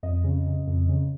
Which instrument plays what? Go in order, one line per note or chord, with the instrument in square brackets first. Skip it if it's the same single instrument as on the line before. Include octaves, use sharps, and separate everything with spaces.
[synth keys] F2 D#5
C#3
C#3
F2
C#3